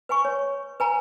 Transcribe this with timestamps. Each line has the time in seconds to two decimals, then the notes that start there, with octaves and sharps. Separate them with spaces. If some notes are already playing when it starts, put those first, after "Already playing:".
0.09 B4 F#5 G#5 C#6
0.25 C#5
0.80 B4 G#5 A#5